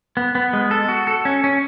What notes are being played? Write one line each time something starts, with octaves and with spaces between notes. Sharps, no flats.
B3
B3
G#3
A4
F#4
A4
C#4
C#4